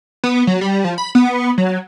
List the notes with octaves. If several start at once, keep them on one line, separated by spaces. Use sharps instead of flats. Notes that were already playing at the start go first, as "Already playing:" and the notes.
B3
F#3
G3
F3
B5
B3
F#3